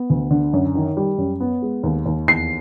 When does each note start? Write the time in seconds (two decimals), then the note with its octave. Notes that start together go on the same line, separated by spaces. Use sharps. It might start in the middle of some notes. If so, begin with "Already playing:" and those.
Already playing: B3
0.10 D2
0.30 D3
0.53 F#2
0.75 D#3
0.97 G3
1.18 F#2
1.40 B3
1.62 G#3
1.83 D#2
2.06 D#2
2.27 E2 C7